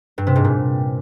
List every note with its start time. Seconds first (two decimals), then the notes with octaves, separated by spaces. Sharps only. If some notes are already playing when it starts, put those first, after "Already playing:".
0.18 G2
0.27 C3
0.36 G#2
0.44 A#2